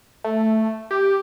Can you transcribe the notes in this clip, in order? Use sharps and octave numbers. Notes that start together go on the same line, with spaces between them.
A3
G4